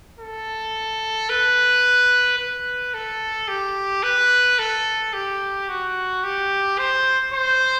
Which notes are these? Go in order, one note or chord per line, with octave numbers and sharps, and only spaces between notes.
A4
B4
B4
A4
G4
B4
A4
G4
F#4
G4
C5
C5